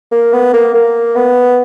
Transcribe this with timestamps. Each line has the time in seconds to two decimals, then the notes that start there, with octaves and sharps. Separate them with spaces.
0.11 A#3
0.33 B3
0.53 A#3
0.74 A#3
1.16 B3